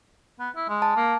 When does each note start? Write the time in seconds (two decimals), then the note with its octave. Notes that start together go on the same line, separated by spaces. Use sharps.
0.40 B3
0.56 E4
0.69 G#3
0.82 A5
0.96 A#3